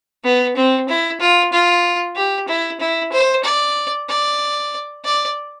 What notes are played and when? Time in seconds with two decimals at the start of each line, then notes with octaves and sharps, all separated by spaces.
0.24 B3
0.56 C4
0.88 E4
1.20 F4
1.52 F4
2.16 G4
2.48 E4
2.80 E4
3.12 C5
3.44 D5
4.08 D5
5.04 D5